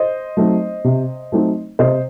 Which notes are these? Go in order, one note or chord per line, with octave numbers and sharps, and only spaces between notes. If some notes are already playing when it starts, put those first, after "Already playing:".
Already playing: C5 D#5
F#3 A3 C4 D#4
C3
F#3 A3 C4 D#4
C3 C5 D#5